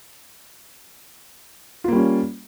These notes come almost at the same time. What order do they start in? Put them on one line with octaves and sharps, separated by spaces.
F4 A#3 G3 C#4